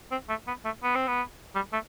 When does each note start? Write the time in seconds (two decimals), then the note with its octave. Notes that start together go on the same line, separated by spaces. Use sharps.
0.11 C4
0.29 A3
0.47 B3
0.65 A3
0.83 B3
0.95 C4
1.07 B3
1.55 G3
1.72 A3